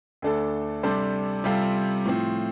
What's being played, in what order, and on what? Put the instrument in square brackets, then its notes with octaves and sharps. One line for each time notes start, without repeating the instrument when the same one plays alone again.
[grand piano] D2 D3 A3 D4 A4
C3 G3 D4 A4 C5
C3 G3 C4 F4 A4
A2 F3 C4